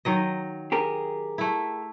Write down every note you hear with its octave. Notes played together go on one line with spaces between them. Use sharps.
D#3 F#3 D#5
G4 G#4 A#4
A3 E4